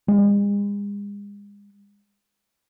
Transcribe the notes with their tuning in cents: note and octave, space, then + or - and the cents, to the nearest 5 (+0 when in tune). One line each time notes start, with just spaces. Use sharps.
G#3 -40